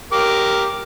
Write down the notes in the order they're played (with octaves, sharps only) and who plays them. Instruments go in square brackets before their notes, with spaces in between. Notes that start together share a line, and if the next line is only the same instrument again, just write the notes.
[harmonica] G4 A#4 D6